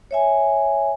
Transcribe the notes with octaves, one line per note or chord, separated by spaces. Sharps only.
C#5 E5 G#5